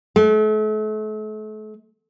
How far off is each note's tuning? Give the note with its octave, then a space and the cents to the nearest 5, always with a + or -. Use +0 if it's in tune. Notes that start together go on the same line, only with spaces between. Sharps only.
A3 -40